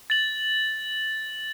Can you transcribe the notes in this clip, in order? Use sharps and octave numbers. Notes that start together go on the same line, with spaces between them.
A6 F#7